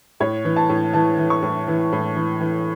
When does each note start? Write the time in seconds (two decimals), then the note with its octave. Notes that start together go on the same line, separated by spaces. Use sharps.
0.20 A2 C#5
0.45 E3
0.56 A5
0.69 A2
0.93 E3 A5
1.18 E3
1.30 C#6
1.43 A2
1.68 E3
1.92 A2
2.17 E3
2.41 E3